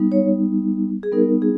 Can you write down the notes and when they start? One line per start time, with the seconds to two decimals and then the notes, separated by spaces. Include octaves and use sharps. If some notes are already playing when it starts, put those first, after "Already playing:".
Already playing: G3 B3 D#4
0.12 C#5
1.03 G#4
1.12 G3 B3 D#4 A#4
1.42 G#4